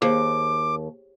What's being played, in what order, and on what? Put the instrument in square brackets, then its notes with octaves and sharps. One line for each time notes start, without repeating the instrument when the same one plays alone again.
[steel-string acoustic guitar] D#2 [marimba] G#4 C5 F5 [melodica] D6